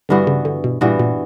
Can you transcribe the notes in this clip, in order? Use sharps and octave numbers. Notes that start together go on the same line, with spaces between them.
G2 D3 E3 B3 F#4
C#3
D3
B2
G2 A#2 E3 B3 F#4
A#2